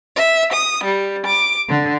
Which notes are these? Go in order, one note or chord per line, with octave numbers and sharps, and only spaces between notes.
E5
D#6
G3
D6
D3